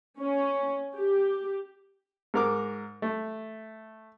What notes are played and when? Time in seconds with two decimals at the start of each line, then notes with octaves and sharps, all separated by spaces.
0.20 C#4
0.96 G4
2.34 G#2 A#4 D6
3.02 A3